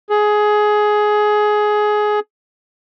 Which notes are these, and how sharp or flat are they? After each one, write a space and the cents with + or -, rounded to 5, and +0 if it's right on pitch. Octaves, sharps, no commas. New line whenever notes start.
G#4 +15